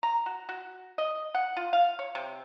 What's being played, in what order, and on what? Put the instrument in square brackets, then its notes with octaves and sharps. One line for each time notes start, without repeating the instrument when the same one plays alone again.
[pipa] A#5
F#4
F#4
D#5
F#5
F4
F5
C#5
C3